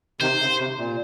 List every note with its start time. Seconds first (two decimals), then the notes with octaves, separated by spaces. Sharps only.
0.21 C3 D#3 C5
0.40 C#3
0.59 C3
0.79 A#2